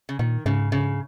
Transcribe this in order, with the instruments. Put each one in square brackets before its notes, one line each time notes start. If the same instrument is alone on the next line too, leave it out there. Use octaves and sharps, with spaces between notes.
[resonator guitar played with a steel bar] C#3
[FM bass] A#2 [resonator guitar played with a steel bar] D#3
[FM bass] G#2 [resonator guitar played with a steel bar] C#3
[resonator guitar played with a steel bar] C#3